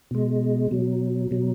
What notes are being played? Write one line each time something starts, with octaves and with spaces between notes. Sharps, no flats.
B2 G#3
B2 F#3
B2 F#3